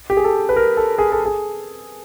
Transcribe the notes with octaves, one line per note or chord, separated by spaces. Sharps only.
G4
G#4
A4
B4
A#4
A4
G#4
A4
G#4